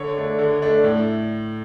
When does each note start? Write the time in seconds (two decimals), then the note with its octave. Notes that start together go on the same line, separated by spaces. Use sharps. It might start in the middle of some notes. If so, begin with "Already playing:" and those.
Already playing: D3 C#5
0.17 A3 D4
0.38 D3
0.62 A3 D4
0.84 A2